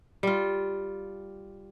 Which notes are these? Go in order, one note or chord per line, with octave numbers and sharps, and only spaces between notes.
G3 F4